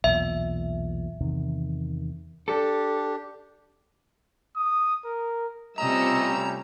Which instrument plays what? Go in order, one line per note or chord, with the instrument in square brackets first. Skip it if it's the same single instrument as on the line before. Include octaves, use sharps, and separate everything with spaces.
[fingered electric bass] B1 E2 A#2 [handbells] E5
[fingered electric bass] E2 C3 D#3
[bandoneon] D4 G4 [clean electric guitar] A4
[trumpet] D#6
A#4
[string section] C3 F4 E6 [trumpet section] G3 A3 C#4 [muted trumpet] D#5 [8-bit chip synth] A#5